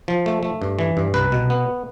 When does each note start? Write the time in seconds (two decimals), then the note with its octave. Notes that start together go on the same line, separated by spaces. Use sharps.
0.08 F3
0.26 A3
0.43 A3
0.62 G2
0.79 E3
0.97 G2
1.14 C2 B4
1.32 B2
1.50 B3